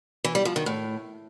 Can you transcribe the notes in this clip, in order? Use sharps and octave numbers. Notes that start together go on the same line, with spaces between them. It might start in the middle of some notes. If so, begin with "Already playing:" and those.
E3
G3
F3
D#3
A2